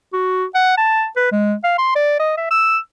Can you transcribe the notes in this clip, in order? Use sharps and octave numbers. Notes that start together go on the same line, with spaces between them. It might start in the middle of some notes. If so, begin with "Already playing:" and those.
F#4
F#5
A5
B4
G#3
F5
C6
D5
D#5
E5
E6